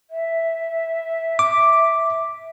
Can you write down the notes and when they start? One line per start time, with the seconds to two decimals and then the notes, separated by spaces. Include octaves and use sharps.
0.10 E5
1.39 D6